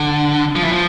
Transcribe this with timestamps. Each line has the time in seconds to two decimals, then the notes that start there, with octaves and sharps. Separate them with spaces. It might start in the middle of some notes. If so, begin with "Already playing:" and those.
Already playing: D3
0.56 F3
0.64 E3
0.73 F3